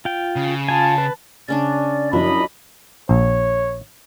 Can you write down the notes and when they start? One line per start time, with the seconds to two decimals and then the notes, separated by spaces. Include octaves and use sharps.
0.05 F4 G5
0.36 C#3
0.68 F4 G#5 A5
0.98 B4
1.48 C#3 C#4 D4 D5
2.13 F#2 F3 F#3 D4 E4 D#5 B5
3.09 A#1 C#5